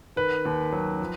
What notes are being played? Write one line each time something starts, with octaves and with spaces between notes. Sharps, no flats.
D#3 B4
D#2
F#3
F3